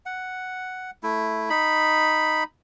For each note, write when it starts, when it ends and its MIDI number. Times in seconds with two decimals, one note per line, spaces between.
0.06 0.91 78
1.03 1.49 57
1.03 1.49 64
1.50 2.44 63
1.50 2.44 83